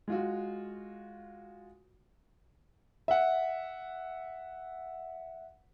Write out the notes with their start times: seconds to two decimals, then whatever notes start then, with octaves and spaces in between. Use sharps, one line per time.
0.08 G#3 F4 F#4
3.08 E5 F#5